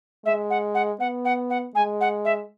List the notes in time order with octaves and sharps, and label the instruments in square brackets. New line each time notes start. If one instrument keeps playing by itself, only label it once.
[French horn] G#3 [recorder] E5
[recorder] F#5
F#5
[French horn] B3 [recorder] F#5
[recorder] F#5
F#5
[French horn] G#3 [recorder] G#5
[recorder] F#5
E5